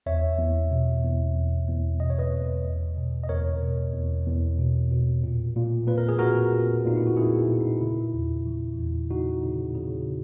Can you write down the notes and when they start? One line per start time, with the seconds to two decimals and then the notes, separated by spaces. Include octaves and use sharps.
0.06 E2 C#5 E5
0.38 E2
0.71 B2
1.04 E2
1.36 E2
1.68 E2
2.00 B2 D#5
2.10 C#5
2.19 B4 D#5
2.33 E2
2.65 E2
2.97 B2
3.24 D#5
3.29 E2 A#4 C#5
3.62 B2
3.94 E2
4.26 E2
4.59 B2
4.91 B2
5.24 A#2
5.56 A#2
5.87 A#2 B4
5.98 A#4
6.09 G#4
6.19 A#2 F#4 A#4
6.52 A#2
6.85 A#2 D#4
6.96 E4
7.07 F#4
7.17 A#2 E4 G#4
7.39 E4
7.49 A#2
7.60 D#4
7.81 C#3 E4
8.14 E2
8.46 E3
8.78 E2
9.10 C#3 D#4 F#4
9.43 C#3
9.75 C#3